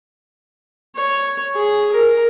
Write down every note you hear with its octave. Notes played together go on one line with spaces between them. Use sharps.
C#5
G#4
A#4